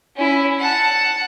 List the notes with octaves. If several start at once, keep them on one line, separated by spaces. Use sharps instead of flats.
C#4 E4
F#5 A5